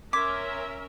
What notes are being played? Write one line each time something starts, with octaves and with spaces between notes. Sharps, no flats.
C#4 A#4 E5 C6 D6 G#6 B6